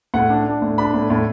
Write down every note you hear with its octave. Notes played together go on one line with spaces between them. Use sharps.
A2 F#5
D4
D4
A2
D4 B5
A2
A2